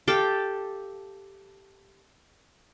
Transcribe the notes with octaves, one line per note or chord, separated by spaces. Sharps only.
G4 A4 F5 G5